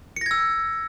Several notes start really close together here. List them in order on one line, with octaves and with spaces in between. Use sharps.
C#7 A#6 G#6 E6